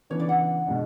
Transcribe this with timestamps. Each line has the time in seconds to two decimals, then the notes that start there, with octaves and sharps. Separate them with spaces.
0.10 C#3 E3 B3 D4 C#5
0.20 D5
0.29 F#5
0.66 B2 G#3 D4